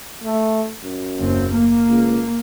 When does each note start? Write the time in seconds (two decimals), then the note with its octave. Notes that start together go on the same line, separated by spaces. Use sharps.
0.24 A3
0.84 F#2
1.17 F#1 D#2 C4
1.49 A#3
1.88 C#2